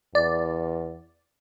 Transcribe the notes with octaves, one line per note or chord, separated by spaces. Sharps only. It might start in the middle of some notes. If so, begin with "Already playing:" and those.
E2 D5